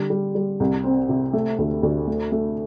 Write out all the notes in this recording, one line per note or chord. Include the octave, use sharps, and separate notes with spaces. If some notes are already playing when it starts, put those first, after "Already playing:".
Already playing: D3 G3
G3
G3
C2
C4
C3
A3
D2
D2
A3
A3